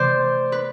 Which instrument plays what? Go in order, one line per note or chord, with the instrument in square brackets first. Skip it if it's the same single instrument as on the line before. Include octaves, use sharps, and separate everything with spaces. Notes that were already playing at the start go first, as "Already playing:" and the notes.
Already playing: [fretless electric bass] C3 E3 A3 [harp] C5 D5
[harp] B4